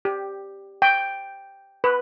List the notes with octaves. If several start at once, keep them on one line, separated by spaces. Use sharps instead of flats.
G4
G5
B4